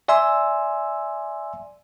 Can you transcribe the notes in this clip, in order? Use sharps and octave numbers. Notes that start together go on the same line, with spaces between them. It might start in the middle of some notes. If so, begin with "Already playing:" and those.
D5 E5 G#5 C6 E6